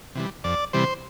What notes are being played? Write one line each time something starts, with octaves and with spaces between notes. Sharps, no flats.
C3 E3 G3
F2 D5
C3 E3 G3 C5